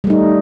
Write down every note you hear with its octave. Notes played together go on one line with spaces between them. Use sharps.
G3 A3 D#4